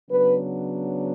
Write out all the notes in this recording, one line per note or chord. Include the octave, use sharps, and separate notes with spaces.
C#3 F#3 B3 D4 B4